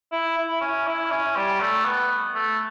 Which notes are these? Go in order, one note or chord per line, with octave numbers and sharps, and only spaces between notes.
E4
E4
C#4
E4
C#4
G3
A3
B3
A3